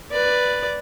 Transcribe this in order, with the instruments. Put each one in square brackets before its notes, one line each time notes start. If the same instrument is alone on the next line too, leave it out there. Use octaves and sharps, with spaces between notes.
[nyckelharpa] B4 D5